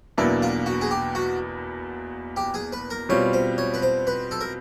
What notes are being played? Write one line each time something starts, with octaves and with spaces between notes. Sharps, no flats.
E2 B2 F#3 A#3 D4 E4
F4
F#4
G#4
G4
F#4
G4
G#4
B4
A#4
B2 G3 C4 F4 C#5
C5
C#5
B4
C5
B4
A4
A#4